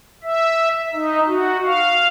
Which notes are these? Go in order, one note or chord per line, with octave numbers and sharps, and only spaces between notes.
E5
D#4
F#4
F5